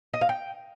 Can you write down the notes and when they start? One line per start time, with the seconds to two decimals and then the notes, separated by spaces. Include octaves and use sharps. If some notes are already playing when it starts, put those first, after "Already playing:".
0.13 D#5
0.21 F5
0.29 G5